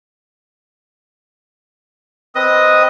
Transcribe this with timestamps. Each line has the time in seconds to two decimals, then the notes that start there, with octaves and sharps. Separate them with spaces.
2.35 C4 B4 D#5 D#6